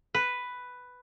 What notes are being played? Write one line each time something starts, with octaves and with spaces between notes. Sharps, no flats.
B4